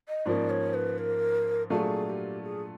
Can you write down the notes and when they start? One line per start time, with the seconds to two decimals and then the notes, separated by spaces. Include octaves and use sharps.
0.08 D#5
0.25 G#2 F3 A#3 C#4 D5
0.50 C#5
0.74 B4
0.98 A#4
1.70 A#2 F#3 A3 D4 F4 G#4
2.06 G#4
2.09 G4
2.43 G#4